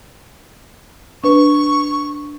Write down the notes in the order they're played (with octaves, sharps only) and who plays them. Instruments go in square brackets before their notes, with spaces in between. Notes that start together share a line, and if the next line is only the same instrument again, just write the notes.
[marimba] D4 B4 [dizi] C#6